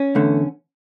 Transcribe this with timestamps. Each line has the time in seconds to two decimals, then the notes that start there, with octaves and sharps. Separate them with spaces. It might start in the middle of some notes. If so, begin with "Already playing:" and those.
Already playing: C#4
0.15 E2 D3 A3